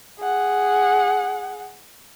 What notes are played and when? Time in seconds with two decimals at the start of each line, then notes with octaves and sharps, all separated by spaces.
0.20 G#4 F#5